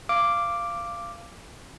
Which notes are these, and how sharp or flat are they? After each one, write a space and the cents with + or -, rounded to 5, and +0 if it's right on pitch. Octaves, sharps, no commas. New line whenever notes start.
F5 -20 D6 +0